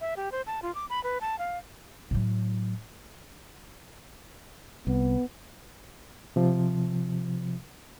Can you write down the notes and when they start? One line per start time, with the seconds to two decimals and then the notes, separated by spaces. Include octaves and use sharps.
0.01 E5
0.17 G4
0.32 C5
0.47 A5
0.62 F4
0.75 D6
0.90 B5
1.04 B4
1.21 A5
1.39 F5
2.11 A2 F#3
4.87 C2 B3
6.36 C3 F3